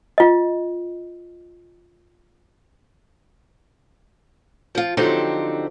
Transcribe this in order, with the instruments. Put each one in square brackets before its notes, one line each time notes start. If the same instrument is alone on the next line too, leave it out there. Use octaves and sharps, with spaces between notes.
[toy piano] F4 D#5
[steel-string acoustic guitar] F3 F4
D3 F3 F#3 C4 D#4 G4